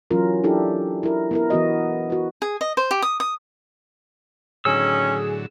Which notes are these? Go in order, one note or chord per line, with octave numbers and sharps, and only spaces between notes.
E3 F#3 C#4 F4 A#4
D4 E4 G4 A4
E4 A#4
B3 E4 A#4
E3 B3 F#4 D#5
F#4 B4
G#4
D#5
C5
G4
D#6
D#6
A2 D3 D#3 F#3 C#4 G#4 E6